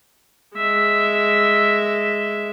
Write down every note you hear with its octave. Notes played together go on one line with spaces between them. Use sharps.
G#3 E5